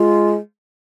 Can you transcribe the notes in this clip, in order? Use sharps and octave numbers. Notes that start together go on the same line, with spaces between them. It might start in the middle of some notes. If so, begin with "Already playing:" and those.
Already playing: G#3 F4